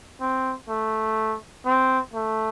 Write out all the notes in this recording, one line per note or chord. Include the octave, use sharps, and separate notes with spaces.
C4
A3
C4
A3